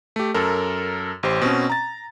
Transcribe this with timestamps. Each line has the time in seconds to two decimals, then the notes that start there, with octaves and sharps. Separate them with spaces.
0.16 A3 G4
0.34 F#2 A4 A#4
1.23 A1 G4 C5
1.41 B2 C4 C#4
1.70 A#5 A6